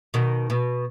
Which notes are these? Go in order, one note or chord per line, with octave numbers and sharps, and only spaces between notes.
B2 D#3
B2